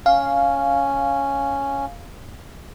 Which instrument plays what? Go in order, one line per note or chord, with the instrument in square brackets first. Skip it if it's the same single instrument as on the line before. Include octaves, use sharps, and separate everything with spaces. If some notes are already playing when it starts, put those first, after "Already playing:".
[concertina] C#4 [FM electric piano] F5